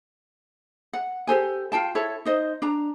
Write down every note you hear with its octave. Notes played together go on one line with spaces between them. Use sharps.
F#5
G4 A4 C5 G#5
F4 F5 G5 A5
E4 A4 C#5
D#4 C5 D#5
D4 A#5